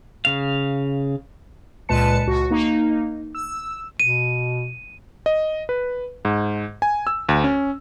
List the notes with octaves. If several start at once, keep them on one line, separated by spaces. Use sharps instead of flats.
C#3 F5
C#2 A#2 G#3 B4 A5 C#7
C#2 F#4
A#3 D#4
E6
B2 D#7
D#5
B4
G#2
G#5
E6
D2
C#4